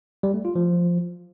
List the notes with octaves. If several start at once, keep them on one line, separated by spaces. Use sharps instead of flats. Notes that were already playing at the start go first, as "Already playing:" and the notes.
G3
A3
F4
F3